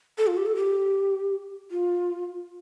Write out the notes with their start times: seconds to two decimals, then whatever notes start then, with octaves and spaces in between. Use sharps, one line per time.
0.18 A4
0.27 F4
0.37 G4
0.46 A4
0.55 G4
1.71 F4